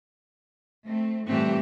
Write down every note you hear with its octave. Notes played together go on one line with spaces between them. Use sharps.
A3 C4
G2 A#2 E3 A3 C4 G4